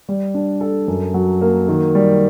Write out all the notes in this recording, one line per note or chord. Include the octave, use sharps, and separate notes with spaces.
G3
D4
A4
F#2
F#3
A#3
D#3
G3